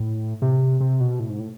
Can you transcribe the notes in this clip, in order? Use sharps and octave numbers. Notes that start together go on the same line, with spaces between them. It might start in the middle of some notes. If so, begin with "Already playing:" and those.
Already playing: A2
C3
C3
B2
A2
G#2
A2